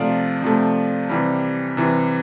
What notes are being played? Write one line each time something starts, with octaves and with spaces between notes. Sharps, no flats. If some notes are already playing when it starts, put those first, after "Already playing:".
Already playing: C3 F3 A3 D5 F5
C3 F3 A3
C3 E3 G3
C3 E3 G3